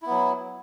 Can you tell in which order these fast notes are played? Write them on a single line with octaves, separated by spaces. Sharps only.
E4 B3 F#3